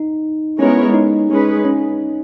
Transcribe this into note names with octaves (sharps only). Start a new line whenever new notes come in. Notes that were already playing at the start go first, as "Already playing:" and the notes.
Already playing: D#4
G#3 B3 C#4 E4 A#4 C#5
D#4
G#3 C#4 G#4 B4
C#4